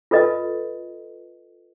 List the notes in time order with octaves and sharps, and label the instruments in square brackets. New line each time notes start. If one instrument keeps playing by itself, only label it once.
[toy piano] F4 A4 B4 D#5